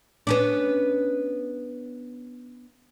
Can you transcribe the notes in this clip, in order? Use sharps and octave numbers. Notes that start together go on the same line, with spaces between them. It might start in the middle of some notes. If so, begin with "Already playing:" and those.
B3 C#4 D4